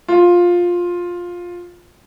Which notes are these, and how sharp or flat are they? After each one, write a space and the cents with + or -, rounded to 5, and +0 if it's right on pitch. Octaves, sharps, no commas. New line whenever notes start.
F4 +10